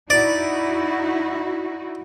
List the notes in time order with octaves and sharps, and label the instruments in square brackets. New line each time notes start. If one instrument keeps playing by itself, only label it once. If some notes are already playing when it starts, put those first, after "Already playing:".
[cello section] D#4 E4 F#4 [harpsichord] D5